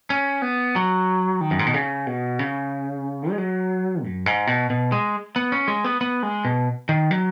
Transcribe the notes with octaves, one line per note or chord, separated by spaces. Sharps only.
C#4
B3
F#3
D#3
F#2
G#2
B2
C#3
B2
C#3
G#3
F#3
F#2
G#2
B2
B2
G#3
B3
C#4
G#3
B3
B3
G#3
B2
D#3
F#3